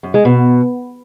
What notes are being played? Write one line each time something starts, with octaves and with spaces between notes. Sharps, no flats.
F#2
G#3
B2